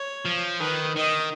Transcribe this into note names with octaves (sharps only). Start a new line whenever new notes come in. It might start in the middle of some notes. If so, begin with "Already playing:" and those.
Already playing: C#5
F3
D#3 B4
D#3 D#5